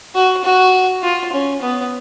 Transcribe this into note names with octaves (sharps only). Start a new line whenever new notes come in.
F#4
F#4
F4
C#4
B3